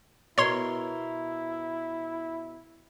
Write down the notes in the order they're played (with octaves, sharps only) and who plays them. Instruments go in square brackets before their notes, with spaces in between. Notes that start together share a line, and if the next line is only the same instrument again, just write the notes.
[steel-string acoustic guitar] B2 A#4 [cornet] E4 [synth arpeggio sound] C#5 C6